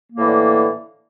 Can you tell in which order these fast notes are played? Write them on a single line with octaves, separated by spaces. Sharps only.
A#3 A2 E3 D3